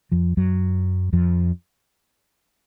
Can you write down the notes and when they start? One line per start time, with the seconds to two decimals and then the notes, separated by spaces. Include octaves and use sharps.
0.12 F2 F3
0.37 F#2 F#3
1.13 F2 F3